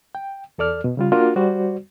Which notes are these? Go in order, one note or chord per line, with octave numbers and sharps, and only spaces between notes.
G5
E2 A4 D5 F6
B2
C#3 G3 F4
A#3 D4 F4 F#4 A#4
G3 F#4 C5 D5